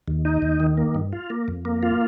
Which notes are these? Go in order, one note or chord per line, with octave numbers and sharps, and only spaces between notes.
D#2
D#4
D#2
D#3
A#3
G2
F4
A#3
F2
A#3
F4